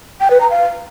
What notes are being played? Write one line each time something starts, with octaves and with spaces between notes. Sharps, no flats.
G5
B4
A#5
F5